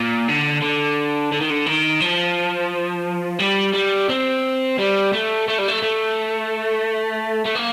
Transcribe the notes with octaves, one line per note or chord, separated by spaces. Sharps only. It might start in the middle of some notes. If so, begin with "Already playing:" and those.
Already playing: A#2
D3
D3
D3
D#3
D3
D#3
F3
G3
G3
C4
G3
A3
A3
G3
A3
A3
A3
A#3